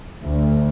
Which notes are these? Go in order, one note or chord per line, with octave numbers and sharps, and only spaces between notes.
D2